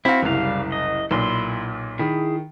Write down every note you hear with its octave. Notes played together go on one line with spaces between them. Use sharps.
C4 E4 F#4 F5
F#1 C2 G3 F5
D#5
B1 A#2 E4 C6
D#3 E4 G#4